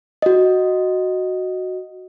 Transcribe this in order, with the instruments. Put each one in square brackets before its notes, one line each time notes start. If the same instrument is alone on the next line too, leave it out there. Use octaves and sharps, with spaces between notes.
[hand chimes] F#4 D#5